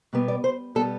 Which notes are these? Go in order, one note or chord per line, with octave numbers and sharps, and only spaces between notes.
B2 G3 B3
D5
C5
B2 G3 B3 A4